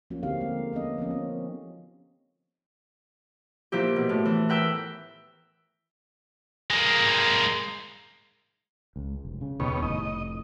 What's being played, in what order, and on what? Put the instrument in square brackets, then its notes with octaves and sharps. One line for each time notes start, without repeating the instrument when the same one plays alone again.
[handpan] F3 A#3 C#4 F4 F#4
D3 C4 D#4 G4 F5
G#3 A#3
A#3 B3 C#4 D#5
F3 A#3 B3 C#4
C4 C#4
[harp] A#2 F3 E4 G4
B2
A2
E3
A#4 B4 G5 E6
[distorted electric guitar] G#3 A#3
[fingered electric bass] C#2
F1
C#3
[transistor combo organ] D#2 B2 C#5
[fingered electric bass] F1 A2 [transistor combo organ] D#5